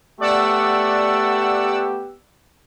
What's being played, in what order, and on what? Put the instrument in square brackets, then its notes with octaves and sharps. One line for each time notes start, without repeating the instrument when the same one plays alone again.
[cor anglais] A3 [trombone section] B3 G4 [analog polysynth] D5 F#5 E6